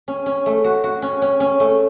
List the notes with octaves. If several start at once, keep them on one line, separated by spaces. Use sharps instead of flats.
C#4
C#4
A3
F#4
F#4
C#4
C#4
C#4
A3